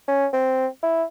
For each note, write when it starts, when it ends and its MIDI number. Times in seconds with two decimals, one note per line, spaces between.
0.08 0.27 61
0.33 0.67 60
0.83 1.04 64